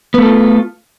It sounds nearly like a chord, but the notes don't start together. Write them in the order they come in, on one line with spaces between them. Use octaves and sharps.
B3 A3 A4 F4